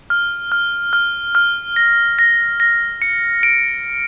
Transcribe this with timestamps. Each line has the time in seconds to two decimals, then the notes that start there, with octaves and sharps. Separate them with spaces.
0.10 F6
0.52 F6
0.93 F6
1.35 F6
1.76 A#6
2.19 A#6
2.60 A#6
3.02 C#7
3.43 D7